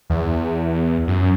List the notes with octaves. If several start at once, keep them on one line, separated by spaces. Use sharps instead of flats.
E2
F#2